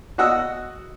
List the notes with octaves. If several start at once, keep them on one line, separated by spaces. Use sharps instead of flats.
F#4 D#5 F#5 E6